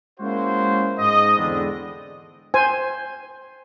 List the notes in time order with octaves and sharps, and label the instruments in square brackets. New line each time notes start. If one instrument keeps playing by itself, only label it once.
[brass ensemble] G#3 A#3 C#4 E4 F#4 C5
G#2 D#5
E2 D3 G#3 B3 C4 D4
[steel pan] C5 G#5